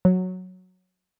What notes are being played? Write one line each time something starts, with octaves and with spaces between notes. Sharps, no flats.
F#3